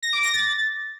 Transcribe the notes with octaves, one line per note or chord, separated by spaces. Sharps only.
A#6
D6
A#6
A6